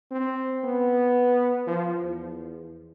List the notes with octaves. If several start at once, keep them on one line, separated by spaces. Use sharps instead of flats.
C4
B3
F3
E2